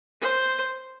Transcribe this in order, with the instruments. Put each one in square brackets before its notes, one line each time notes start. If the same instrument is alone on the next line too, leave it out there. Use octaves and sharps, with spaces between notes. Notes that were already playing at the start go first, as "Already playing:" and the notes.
[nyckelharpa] C5